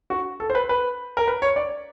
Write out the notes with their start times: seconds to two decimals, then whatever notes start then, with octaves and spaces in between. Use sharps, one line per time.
0.10 F#4
0.40 A4
0.50 C5
0.55 B4
0.69 B4
1.17 A#4
1.28 B4
1.42 C#5
1.56 D5